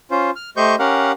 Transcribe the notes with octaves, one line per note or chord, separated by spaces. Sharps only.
C#4 F4 C5
F6
A3 G4 C5 D#5 C#6 G6
C#4 G4 A#4 F5 F#5